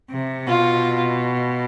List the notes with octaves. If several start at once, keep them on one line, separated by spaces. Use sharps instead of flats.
C3
B2 F4